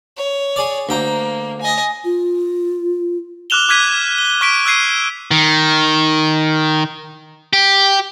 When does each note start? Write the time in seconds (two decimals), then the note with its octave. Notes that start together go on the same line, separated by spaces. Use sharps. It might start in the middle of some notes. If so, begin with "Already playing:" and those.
0.17 C#5
0.56 G#4 D5
0.89 D2 A#3 G5 A#5
1.61 D#5 G#5
2.04 F4
3.50 D6 F6 F#6 E7 F7 G7
3.69 D6 F6 F#6 G#6 B6 D#7
4.18 G7
4.41 C#6 F#6 B6 D7 D#7
4.66 E6 F#6 G#6 C7 D#7
5.31 D#3
7.53 G4